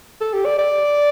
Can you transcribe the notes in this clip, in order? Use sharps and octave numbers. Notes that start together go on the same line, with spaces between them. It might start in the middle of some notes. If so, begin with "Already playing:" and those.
A4
G4
D5
D5